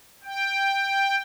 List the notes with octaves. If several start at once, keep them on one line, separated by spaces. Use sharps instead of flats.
G5